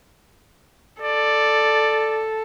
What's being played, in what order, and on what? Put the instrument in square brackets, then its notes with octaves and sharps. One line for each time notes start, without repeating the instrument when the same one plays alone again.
[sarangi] A4 [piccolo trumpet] D5